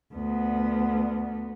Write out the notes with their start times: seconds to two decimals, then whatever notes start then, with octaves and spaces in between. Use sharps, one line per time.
0.15 D2 B3